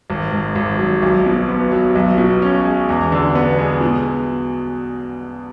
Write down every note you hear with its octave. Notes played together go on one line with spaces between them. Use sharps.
G#1
G#2
G#1
F#3
B1
B2
B3
F#3
B1
B2
C#4
G#3
E2
D3
B3
G#3
B2